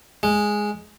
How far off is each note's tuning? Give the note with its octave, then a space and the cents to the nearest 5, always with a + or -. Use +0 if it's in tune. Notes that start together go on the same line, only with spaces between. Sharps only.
G#3 +0